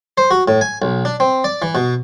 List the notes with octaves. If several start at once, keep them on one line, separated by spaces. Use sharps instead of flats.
C5
F#4
A2
G#5
B1
D4
C4
D5
E3
B2